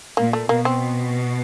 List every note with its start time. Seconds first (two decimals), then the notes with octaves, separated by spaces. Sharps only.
0.17 A#2 A#3
0.33 A3
0.49 B2 A#3
0.65 C4